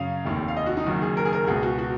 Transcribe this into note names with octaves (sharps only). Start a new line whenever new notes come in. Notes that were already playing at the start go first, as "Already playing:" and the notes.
Already playing: F#2 C#3 F5
F1 D#2 D#3
F5
D#5
F#4
D#4
F#1 F#2 D#3 F#4
G#4
A#4
G#4
A#4
C#2 B2 G#4
F#4
F#4